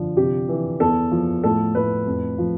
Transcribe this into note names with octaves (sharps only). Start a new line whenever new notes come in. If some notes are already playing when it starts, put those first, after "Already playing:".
Already playing: D3 F3
C3 G4
E3
E2 A4
F3
A2 A4
A2 B4
F2
F3